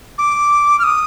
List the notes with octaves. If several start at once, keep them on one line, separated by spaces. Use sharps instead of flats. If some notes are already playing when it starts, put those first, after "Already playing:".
D6
F6
D#6